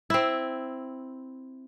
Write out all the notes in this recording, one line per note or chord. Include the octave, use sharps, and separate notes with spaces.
C4 E4